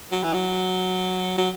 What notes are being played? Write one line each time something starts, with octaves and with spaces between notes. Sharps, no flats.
F#3
E3
F#3
F#3